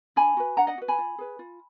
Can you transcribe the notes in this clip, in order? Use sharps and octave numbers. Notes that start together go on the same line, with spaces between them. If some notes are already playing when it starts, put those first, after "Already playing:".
D4 G#5 B5
F#4 B4
D4 F#5 A#5
D#5 F#5
F#4 B4
G#5 B5
F4
G#4 B4
F4